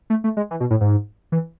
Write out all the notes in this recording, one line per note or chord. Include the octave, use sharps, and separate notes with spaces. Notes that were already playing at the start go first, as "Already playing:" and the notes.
A3
A3
G#3
E3
B2
A2
G#2
E3